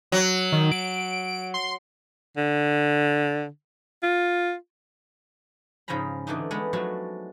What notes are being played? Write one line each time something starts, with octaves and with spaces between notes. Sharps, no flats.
F#3
D#3
D7
C6
D3
F4
G#2 C#3 F3 G#5 A#5 B5
D3 E3 A3 D4 D#4
G#3 A3 B3
F3 F#3 G#3 A3 F#4